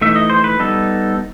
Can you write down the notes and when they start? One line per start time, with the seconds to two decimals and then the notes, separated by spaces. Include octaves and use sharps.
0.01 E3 A3 D#4 E5
0.16 D#5
0.30 C5
0.44 B4
0.59 G3 B3 D#4 A4